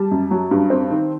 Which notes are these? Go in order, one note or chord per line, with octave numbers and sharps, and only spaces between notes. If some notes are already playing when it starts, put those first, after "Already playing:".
Already playing: G3 A5
F#2
F#3
G2
C4
D#3